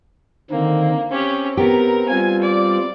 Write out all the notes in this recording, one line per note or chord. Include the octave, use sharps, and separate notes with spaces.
D3 D#3 A#3 C4
C4 C#4 G4
B3 G4 A#4
G3 C4 F4 G#5
D5